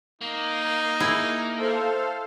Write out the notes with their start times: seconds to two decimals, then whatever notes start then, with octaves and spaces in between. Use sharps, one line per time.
0.21 A#3 D#4
1.00 E4 G#4
1.57 A4 C5 F5